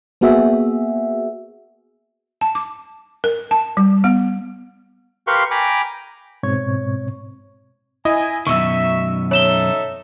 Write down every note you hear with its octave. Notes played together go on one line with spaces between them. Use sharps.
A#3 B3 F#4 G#4 E5
A5
D6
A#4
A5
G3
B3
G4 A#4 B4 F5 C6 C#6
G5 G#5 A#5 B5 D6
G#2 B2 C4 C#5 C#6 G#6
E4 D#5 G#5
F#2 B2 D#3 E5 C#6 E6
D#4 A4 C#5 E5 E7 G7